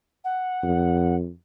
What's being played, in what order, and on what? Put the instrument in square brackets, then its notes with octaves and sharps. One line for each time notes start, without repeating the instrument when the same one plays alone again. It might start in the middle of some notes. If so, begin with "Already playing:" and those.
[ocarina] F#5
[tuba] F2